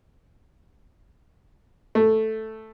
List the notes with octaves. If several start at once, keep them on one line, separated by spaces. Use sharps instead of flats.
A3